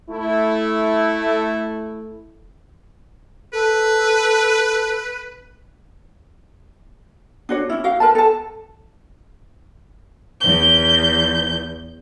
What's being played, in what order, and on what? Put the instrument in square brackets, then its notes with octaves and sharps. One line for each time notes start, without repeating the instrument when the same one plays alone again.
[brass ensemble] A3 E4
[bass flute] A4 [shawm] B4
[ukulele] D4 F#4 C#5
C#4 E4
F#4 F5
A#4 B4 A5
A4 A5
[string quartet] E2 G6